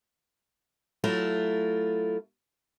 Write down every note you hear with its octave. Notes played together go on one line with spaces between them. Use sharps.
F#3 A3 E4 F4